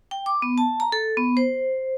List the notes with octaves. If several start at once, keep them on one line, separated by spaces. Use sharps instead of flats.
G5
D6
B3
A5
A#5
A4
B3
C5